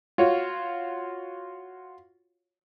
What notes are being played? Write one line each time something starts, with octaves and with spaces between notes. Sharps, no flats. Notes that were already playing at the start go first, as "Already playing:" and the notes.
F4 F#4 C#5